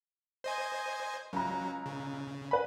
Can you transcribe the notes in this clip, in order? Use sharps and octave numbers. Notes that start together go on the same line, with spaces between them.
C5 D#5 G#5
C#2 F#3 A#5
C#3
B4 B5